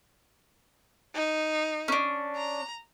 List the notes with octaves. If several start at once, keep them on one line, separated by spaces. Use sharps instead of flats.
D#4
C#4 D4
A#5